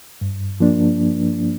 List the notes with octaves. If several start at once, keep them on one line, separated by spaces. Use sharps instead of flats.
G2
F3 A#3 D4